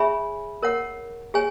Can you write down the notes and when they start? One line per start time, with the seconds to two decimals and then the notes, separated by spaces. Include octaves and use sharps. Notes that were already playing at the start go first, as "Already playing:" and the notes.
Already playing: G#4 C#5 E5 G#5 B5
0.63 A#4 C#5 F#5
1.34 G#4 C#5 G#5